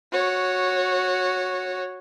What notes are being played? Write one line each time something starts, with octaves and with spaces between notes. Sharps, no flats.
F#4 C#5